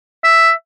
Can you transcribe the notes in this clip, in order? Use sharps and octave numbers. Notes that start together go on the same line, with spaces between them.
E5